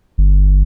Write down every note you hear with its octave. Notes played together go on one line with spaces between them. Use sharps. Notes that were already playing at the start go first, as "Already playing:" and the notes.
G1